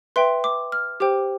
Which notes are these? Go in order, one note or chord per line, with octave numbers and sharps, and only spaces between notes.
B4 E5 G5 C6
D6
F6
G4 C5 G5 D6